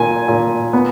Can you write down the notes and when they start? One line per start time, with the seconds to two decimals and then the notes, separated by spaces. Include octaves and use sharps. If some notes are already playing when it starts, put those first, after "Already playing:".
Already playing: A#2 G#5
0.28 A#2
0.73 B3